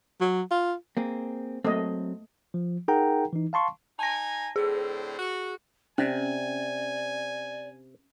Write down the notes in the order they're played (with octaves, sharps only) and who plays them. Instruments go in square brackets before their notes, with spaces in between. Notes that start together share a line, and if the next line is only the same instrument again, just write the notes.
[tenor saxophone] F#3
F4
[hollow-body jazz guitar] A#3 C4 G#4
[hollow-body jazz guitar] F#3 C4 [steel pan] A3 A#3 D#5
[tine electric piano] F3
D#4 G#4 A#4 F#5 G5 A#5
E3 D#4
F5 A5 C6 C#6
[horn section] D#4 G#5 [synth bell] A5 A#6
[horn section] A2 D3 C4 [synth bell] G#4
[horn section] F#4
[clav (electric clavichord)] C3 [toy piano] C#4 [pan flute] D5 [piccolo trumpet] G#5